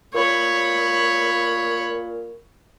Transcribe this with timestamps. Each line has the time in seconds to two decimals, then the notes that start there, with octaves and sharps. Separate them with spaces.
0.14 A#2 C#5 B5